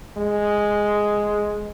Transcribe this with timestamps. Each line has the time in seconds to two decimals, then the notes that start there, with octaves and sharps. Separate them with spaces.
0.17 G#3